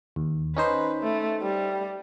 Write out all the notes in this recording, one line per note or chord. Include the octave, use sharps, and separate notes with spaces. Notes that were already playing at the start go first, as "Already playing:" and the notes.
D#2
C#4 D#4 B4 C5
A3
G3